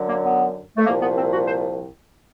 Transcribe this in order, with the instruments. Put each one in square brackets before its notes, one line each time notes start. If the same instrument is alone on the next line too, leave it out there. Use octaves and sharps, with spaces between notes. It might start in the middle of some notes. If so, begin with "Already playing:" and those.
Already playing: [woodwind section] F#2 D3 F#3
A#3
B3
A3
C2 A#2 F3 A#3
B3
C4
F#4
C5